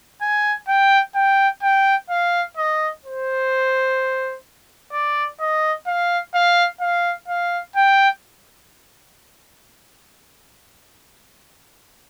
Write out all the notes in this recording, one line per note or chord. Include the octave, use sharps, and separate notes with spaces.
G#5
G5
G5
G5
F5
D#5
C5
D5
D#5
F5
F5
F5
F5
G5